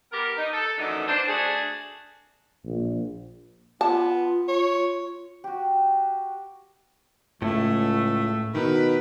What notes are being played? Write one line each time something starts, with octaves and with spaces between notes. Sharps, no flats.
G3 B3 G4 A#4
D#4
A4
F#2 D#3 E3 A3 D4 D#4
D4 C5
A3 D4 F#4 G#4
A#1
B3 F4 A5
C#5
F#4 G4
C#2 A2 A3
B2 D#3 B4